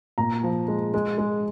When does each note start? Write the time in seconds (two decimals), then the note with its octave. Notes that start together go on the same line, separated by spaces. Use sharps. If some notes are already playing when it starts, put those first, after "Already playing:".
0.18 A#2 A#5
0.43 F3
0.68 G#3
0.94 G#3
1.18 G#3